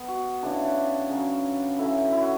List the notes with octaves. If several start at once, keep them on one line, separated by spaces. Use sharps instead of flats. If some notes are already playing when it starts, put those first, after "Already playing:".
Already playing: B3 A4
F#4
C#3 E3 B3 D4
C#3 F#3 C#4
D3 F#3 C#4 E4
E4
F#4